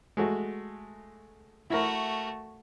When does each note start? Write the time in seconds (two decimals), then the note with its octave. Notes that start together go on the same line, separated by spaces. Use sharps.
0.17 G#3 A3 F#4
1.70 A3 E4 F#4 A#4